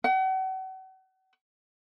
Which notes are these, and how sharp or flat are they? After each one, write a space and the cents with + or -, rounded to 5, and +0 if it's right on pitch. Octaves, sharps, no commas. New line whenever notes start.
F#5 +40